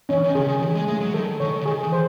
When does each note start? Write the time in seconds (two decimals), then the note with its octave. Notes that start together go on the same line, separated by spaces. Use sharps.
0.09 E3 C#4
0.22 D#3
0.35 C#3 G#4
0.48 D#3
0.62 E3 G#4
0.75 G#3
0.87 G#3 A3
1.00 F#3
1.14 D#3 A4
1.40 D#3 C#5
1.61 C#3
1.66 D#3 G#4
1.83 E3
1.92 C5